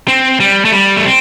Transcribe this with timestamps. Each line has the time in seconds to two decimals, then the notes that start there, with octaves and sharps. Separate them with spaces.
0.08 C4
0.40 G3
0.65 A3
0.72 G3
0.97 A3
1.05 C4